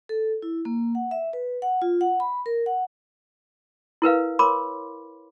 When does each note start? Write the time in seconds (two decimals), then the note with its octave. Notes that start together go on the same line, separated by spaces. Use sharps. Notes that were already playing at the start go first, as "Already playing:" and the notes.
0.09 A4
0.42 E4
0.65 A#3
0.95 F#5
1.11 E5
1.33 B4
1.62 F#5
1.82 F4
2.01 F#5
2.20 B5
2.46 A#4
2.66 F#5
4.02 E4 A#4 B4 F5
4.39 A#4 C#5 B5 C6 D6